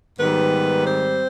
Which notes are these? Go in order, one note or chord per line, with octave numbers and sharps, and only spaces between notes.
G#2 D#3 G3 B3 B4
C4 C5